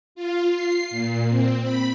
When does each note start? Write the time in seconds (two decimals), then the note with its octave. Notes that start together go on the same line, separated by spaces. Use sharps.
0.15 F4
0.54 C7
0.91 A#2
1.30 C4
1.63 B5